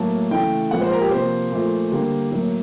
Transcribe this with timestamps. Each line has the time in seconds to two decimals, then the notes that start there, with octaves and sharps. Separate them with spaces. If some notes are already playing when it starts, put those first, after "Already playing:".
Already playing: A2 F#3 A#3 A5
0.31 C#3 E3 A3 G5
0.71 A#2 F3 G#3 F#5
0.81 C5
0.91 A#4
1.02 G4
1.11 C3 F3 A#3 C5
1.51 A#2 F3 A3
1.91 D3 G3 A#3
2.32 A2 F#3 A#3